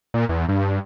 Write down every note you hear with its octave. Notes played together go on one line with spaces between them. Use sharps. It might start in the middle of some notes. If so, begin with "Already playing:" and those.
A#2
E2
G2